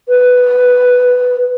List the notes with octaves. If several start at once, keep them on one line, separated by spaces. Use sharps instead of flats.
B4